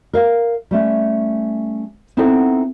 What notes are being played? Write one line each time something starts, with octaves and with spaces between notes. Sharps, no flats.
A#4 F5
G3 A3 C#4
B3 C4 D#4 E4 A4 F#5